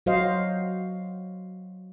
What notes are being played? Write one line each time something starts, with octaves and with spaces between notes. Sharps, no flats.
F#3 F#4 C5 D#5 F5